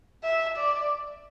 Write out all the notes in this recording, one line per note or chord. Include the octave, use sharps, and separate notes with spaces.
E5
D5